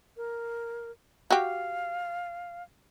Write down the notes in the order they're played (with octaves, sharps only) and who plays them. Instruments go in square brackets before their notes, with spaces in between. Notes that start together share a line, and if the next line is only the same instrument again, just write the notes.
[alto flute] A#4
[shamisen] F#4 G4 [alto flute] F5